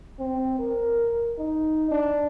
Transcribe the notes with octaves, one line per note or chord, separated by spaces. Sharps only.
C4
A#4
D#4
D4